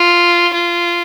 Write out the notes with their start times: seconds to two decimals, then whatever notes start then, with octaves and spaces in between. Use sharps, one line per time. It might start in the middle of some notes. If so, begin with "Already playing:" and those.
Already playing: F4
0.53 F4